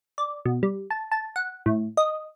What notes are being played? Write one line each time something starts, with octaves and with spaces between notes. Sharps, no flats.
D5
B2
G3
A5
A5
F#5
A2
D#5